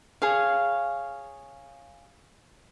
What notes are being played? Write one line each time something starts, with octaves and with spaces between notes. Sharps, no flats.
G#4 C#5 F5